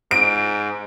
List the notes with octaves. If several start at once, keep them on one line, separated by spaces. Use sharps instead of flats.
G#2 D7